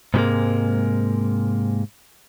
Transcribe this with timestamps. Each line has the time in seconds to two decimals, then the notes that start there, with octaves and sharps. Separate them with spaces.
0.14 G#2 C3 E3 G3 G#3 A#3